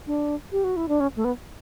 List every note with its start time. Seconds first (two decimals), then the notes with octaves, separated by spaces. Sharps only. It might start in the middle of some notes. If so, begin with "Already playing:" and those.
0.07 D4
0.52 G4
0.64 F#4
0.77 E4
0.89 D4
1.00 C#4
1.16 A3
1.25 B3